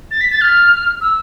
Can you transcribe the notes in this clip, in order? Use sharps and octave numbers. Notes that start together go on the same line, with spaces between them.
A6
B6
A6
F6
E6